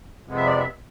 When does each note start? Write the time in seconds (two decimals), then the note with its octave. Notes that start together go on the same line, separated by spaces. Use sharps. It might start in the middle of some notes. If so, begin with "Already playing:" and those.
0.25 F2 C3 G#3 B3
0.36 E5
0.46 D5
0.57 E5